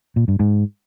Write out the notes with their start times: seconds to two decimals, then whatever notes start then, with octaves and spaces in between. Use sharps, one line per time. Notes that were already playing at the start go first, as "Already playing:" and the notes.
0.16 A#2
0.28 G2
0.40 G#2